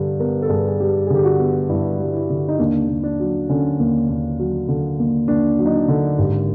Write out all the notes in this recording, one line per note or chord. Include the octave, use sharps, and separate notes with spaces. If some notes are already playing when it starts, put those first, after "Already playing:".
Already playing: G2 D3 G3
B3 A#4
A4
G2 G#4
G#4
G3 G4
D3 G#4
G4
F#4
B3
G2 E4
G3
E4
D3
D#4
D#2 D4
D#2
D4
F#3
D3 C#4
D#2
D#2
F#3
D3
D#2
D#2 D4
F#3
D#4
D4
D3
G#1 G4